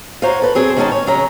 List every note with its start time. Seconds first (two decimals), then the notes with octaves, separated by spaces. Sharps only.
0.22 F4 F#4 C5 C#5 A#5
0.42 A4 B4
0.55 F#3 C4 G#4 A4 C5 C#5
0.77 D#3 G#3 C#4 D#4 F#4 A5
0.92 C#5
1.07 F2 C#3 F#3 G#3 C#4 A#5